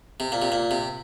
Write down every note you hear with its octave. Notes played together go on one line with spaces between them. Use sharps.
C3
A#2
C3
A#2
C3